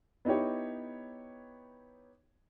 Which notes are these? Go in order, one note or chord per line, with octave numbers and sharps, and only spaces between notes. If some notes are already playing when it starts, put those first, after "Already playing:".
B3 D#4 E4 G4 C#5